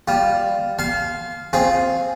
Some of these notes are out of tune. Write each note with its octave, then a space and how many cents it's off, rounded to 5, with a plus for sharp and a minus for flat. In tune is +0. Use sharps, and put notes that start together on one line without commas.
G3 +0 F4 +0
F5 +0 A5 -40 C6 +0
C4 +0 F4 +0 G#4 +0